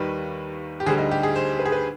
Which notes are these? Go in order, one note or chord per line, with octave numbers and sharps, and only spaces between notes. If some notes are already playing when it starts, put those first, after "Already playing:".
Already playing: D#2 D#3 G3 B4
G4
D2 D3 G3 G#4
D#4
G4
G#4
C5
B4
G#4
B4